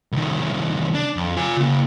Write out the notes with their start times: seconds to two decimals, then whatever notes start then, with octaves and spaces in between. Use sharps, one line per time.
0.12 C2 D#3
0.95 D4
1.16 F2
1.36 F4 G#5
1.57 C#3 A#3